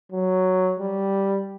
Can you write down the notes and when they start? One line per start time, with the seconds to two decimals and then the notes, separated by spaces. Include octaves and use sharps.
0.12 F#3
0.80 G3